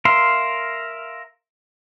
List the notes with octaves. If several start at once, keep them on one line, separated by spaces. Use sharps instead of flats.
A#4 E5 F5 C6